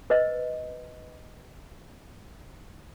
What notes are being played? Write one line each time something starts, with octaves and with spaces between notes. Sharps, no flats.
B4 C5 D#5